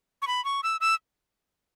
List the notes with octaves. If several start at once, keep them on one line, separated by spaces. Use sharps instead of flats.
C#6
B5
C#6
E6
E6